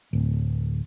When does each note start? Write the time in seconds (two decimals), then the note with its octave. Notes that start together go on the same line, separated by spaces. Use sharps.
0.13 D1